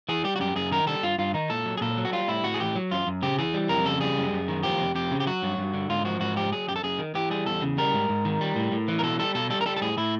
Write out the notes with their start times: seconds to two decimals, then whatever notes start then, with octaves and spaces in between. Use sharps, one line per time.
0.09 E3 G#4
0.24 G3 G4
0.36 F#4
0.40 F#2 G4
0.56 F#2 G#4
0.71 D#3 A#4
0.87 G3 A4
1.03 G2 F4
1.18 G2 F4
1.34 D#3 D#4
1.50 A#2 A4
1.65 F#3
1.77 G#4
1.81 A#2 A4
1.97 F#3
2.05 F#4
2.12 G3 F4
2.28 A2 E4
2.44 A2 F#4
2.54 G#4
2.60 E3 G4
2.76 F#3
2.91 F#2 F4
3.07 F#2
3.22 C#3 G4
3.38 E3 G#4
3.54 G3
3.69 F2 A#4
3.85 C#3 A4
4.01 G3 G#4
4.17 F#2
4.33 F#2
4.48 D#3
4.63 F3 G4
4.80 F2
4.95 F2 G4
5.11 C#3
5.20 G4
5.27 F#3 F#4
5.43 G2
5.57 G2
5.74 D3
5.90 G#2 F4
6.05 F3 F#4
6.20 G#2 F#4
6.36 F3 G4
6.52 F#3 G#4
6.68 F#2 G4
6.76 A4
6.84 F#2 G#4
6.99 D#3
7.15 E3 G4
7.31 G3 G#4
7.46 E2 A4
7.62 C#3
7.78 G3 A#4
7.93 G#2
8.09 G#2
8.25 D#3
8.41 G3
8.56 A2
8.72 A2
8.88 E3
8.99 A#4
9.03 B2 A4
9.19 G3 A4
9.35 B2 A4
9.50 G3 A4
9.61 A#4
9.66 G3 A4
9.76 A4
9.82 A2 G#4
9.97 A2 E4